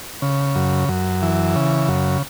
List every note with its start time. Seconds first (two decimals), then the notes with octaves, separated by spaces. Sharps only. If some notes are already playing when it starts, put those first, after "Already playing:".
0.22 C#3
0.55 F#2
0.88 F#2
1.22 E3
1.56 C#3
1.88 F#2